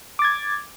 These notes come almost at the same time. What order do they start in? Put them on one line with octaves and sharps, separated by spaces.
D6 A6 G#6